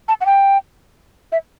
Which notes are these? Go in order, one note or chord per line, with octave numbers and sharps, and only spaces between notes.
A5
F#5
G5
E5